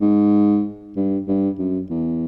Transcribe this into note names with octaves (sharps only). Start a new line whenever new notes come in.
G#2
G2
G2
F#2
E2